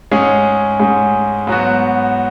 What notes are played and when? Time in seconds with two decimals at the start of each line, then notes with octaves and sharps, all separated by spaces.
0.12 G#2 G#3 C#4 G#4
0.80 G#2 G#3 C#4 G#4
1.47 G#2 F#3 B3 F#4